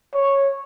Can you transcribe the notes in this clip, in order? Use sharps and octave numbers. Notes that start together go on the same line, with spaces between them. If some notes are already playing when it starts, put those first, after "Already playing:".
C#5